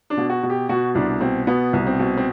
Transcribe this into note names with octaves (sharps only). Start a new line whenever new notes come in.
D4
B2
F#4
B2
G4
B2 F#4
C2 D4
B2 C4
B2 B3
C2
C4
B2
C4